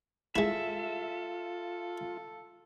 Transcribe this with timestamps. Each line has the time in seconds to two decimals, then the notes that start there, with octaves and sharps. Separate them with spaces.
0.36 G#3 E4 F4 A4 E5